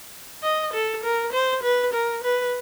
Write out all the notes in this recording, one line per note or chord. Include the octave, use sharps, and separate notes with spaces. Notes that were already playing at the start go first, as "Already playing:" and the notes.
D#5
A4
A#4
C5
B4
A#4
B4